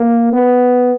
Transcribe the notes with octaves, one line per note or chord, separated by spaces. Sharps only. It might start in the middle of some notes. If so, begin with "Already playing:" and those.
Already playing: A#3
B3